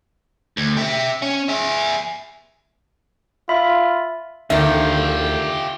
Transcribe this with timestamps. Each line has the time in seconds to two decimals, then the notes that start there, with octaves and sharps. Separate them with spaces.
0.57 D2
0.77 G4 E5
1.22 C#4
1.49 G#4 E5
3.49 F4 E5 B5
4.50 D2 D3 D#3 F4 G4 E5